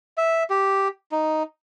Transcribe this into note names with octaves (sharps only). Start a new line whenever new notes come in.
E5
G4
D#4